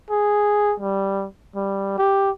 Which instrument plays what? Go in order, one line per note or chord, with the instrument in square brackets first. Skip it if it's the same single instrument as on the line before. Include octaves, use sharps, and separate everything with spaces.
[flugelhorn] G#4
G3
G3
G4